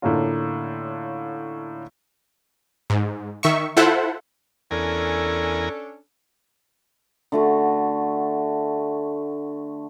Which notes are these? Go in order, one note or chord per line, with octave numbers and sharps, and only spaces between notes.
A2 D3 A3 A#3 C#4 F4
G#2
D#3 E5 C#6
E4 F4 A4 C5 E5 F#5
E2 C#4 D4 A4 A#4 G#5
D3 A3 F#4